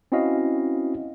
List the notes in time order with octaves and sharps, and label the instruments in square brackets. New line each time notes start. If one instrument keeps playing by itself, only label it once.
[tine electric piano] C4 C#4 E4 F#4 D#5 F5